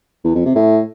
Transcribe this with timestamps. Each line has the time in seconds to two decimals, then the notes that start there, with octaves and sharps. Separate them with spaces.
0.24 E2
0.35 F2
0.45 C3
0.56 A2